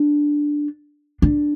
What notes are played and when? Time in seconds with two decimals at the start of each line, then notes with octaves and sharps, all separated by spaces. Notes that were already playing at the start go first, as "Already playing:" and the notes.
Already playing: D4
1.22 D4